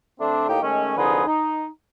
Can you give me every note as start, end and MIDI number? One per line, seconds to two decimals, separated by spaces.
0.20 0.47 50
0.20 0.47 57
0.20 0.47 60
0.20 0.47 62
0.49 0.61 45
0.49 0.61 58
0.49 0.61 63
0.49 0.61 67
0.49 0.61 79
0.62 0.93 51
0.62 0.93 56
0.62 0.93 57
0.62 0.93 61
0.97 1.26 36
0.97 1.26 50
0.97 1.26 53
0.97 1.26 63
0.97 1.26 68
0.97 1.26 71
1.26 1.67 63